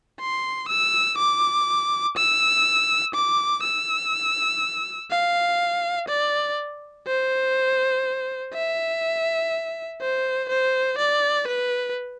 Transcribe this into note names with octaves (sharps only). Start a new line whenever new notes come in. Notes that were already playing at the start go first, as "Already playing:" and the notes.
C6
E6
D6
E6
D6
E6
F5
D5
C5
E5
C5
C5
D5
B4